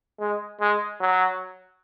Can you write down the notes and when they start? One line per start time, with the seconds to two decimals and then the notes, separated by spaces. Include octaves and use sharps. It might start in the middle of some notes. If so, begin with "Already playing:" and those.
0.20 G#3
0.60 G#3
1.00 F#3